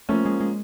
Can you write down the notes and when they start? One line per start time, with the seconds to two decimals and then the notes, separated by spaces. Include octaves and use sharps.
0.09 F3 A3 A#3 C#4
0.25 G#3
0.40 G#3